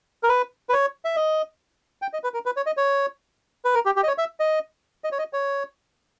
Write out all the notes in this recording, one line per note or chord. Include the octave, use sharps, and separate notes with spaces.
A#4
B4
B4
C#5
E5
D#5
G5
D#5
B4
A#4
B4
C#5
D#5
C#5
B4
A#4
G4
G4
D#5
C#5
E5
D#5
D#5
C#5
D#5
C#5